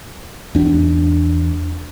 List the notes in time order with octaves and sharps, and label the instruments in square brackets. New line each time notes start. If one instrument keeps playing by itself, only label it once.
[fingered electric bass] E2 D4